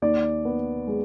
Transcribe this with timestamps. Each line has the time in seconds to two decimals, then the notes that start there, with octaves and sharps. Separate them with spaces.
0.02 D#2 D5
0.45 B3
0.87 G#3